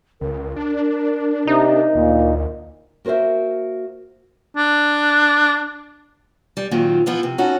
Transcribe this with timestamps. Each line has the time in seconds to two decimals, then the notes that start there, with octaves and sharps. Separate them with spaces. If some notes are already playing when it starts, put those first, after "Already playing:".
0.21 C#2 A#4
0.56 D4
1.47 C3 D#4
1.95 D2 A#2
3.05 A#3 F#4 A#4 C5 E5
4.57 D4
6.57 G3
6.71 A#2 D#3 F#3 C4 F4
7.06 E3 F3 B3 E4
7.23 C3
7.38 C#4 D#4 F#4 A4